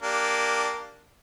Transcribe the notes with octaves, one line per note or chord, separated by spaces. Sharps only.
A#3 D4 G4